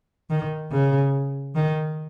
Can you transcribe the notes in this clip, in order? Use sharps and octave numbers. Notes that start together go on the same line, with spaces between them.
D#3
C#3
D#3